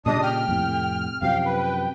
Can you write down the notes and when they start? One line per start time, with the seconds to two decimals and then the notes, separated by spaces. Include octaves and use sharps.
0.06 A#2 C#3 G3 D4 D#5 D#6
0.22 G5 F6
0.48 F2 A2 C3
1.22 F#2 C3 F3 F5 G5
1.46 B4